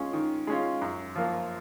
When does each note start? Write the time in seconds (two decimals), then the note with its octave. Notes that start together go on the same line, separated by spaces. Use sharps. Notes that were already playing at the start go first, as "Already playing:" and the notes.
Already playing: G#3 C#4 F4
0.13 D#3
0.47 G#3 C#4 F4
0.82 F#2
1.16 F3 A#3 F4